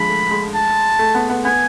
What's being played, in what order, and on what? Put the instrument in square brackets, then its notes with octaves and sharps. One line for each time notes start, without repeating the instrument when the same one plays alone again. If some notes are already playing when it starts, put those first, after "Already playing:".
Already playing: [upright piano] D3 F3 G#3 [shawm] B5
[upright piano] A3
G#3
[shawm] A5
[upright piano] A3
B3
B3
[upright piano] B3 [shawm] G#5